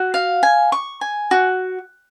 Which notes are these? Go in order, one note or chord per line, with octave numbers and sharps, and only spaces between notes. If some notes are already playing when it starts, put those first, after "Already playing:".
Already playing: F#4
F5
G#5
C#6
G#5
F#4